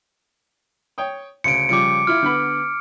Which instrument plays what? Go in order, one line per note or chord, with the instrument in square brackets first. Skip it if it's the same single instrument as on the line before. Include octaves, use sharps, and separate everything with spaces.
[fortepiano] C#5 G5 D#6
[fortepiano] D2 C#3 [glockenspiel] C#7 D7
[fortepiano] C#3 F3 G3 [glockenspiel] D6 C#7
[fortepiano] E4 F4 [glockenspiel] F6
[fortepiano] D3 B3 B5